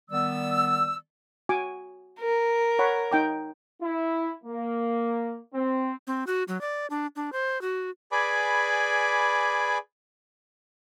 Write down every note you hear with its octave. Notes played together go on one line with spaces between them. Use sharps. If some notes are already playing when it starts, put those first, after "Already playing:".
D#3 G3 B3 D5 E6
F#4 G#5 D6
A#4
C#5 F#5 B5
D#4 G5 D6
E4
A#3
C4
C4
F#4
F#3
D5
D4
D4
C5
F#4
G#4 B4 D5 G#5 B5 D6